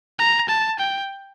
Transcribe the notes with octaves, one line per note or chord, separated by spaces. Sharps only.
A#5
A5
G5